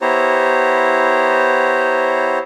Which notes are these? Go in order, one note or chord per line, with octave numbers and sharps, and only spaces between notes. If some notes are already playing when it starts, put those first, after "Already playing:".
B3 E4 G4 C5 C#5 A#5